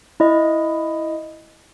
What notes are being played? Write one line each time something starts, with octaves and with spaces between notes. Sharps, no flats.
E4 D#5